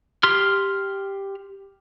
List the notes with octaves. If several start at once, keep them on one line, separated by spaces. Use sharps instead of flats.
G4 C6 F6